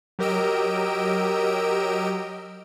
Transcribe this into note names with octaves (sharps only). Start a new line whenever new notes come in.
F#3 G4 A#4 D#5 E6 D7